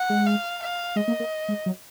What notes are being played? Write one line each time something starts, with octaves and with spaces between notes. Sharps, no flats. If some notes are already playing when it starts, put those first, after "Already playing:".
Already playing: F#5
G#3
F5
F5
G#3 D#5
A#3
A#3
G#3
F#3